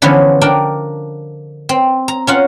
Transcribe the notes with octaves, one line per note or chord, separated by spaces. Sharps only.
D3 E3 F3 B3 C#4
D4 A#4 G5
C4
A#5
C#4 F4 F#5